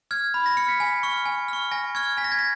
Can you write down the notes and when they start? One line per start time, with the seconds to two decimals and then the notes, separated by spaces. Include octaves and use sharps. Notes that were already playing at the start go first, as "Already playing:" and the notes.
0.11 F6 G#6
0.34 B5
0.46 A#6
0.57 F6 C#7
0.69 B6
0.80 G#5
1.03 C#6 F6
1.26 G#5
1.48 C#6 F6
1.71 G#5 A#6
1.95 C#6 F6 G#6
2.17 G#5 B6
2.24 A#6
2.32 G#6
2.39 A#6